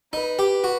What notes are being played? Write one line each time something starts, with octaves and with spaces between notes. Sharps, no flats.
D#4 B4
G4
F#4